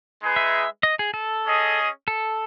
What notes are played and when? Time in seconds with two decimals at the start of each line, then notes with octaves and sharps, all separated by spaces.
0.21 G#3 D#4 G#4 B4
0.36 E5
0.83 D#5
0.99 G#4
1.14 A4
1.45 C#4 G#4 D#5
2.08 A4